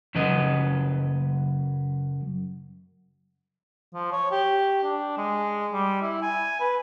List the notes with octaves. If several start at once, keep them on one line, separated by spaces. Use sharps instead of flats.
F#2 C#3 F#3 B4 D#5
F3
C#5
G4
D4
G#3
G3
E4
G#5
B4